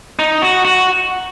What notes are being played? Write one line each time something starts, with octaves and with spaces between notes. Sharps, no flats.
D#4
F#4
F#4